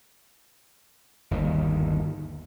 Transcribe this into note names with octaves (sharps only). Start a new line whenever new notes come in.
G1 D#2 D#3